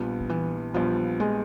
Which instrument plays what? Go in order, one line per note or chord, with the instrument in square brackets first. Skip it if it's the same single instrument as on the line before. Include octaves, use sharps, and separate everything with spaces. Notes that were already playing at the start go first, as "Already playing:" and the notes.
Already playing: [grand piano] A#1 A#2 G3 B3
[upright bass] D#3
E3
[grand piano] A#1 A#2 G3 B3 [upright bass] F3
[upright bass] G#3